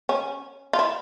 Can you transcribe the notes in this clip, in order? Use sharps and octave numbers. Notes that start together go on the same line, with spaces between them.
C#4
F4
E4